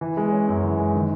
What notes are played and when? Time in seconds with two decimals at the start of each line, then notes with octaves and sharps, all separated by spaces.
0.01 E3
0.17 G#3
0.32 C#4
0.49 F#2
0.64 E3
0.80 G#3
0.95 D#3